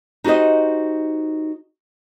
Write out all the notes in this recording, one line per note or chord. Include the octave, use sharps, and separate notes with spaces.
D#4 F#4 G4 C5 D#5